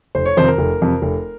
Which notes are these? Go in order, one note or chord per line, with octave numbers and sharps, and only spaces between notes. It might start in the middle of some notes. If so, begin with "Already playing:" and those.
F1 C5
C#5
F2 C3 D#3 C5
A#4
F1
F2 C3
F1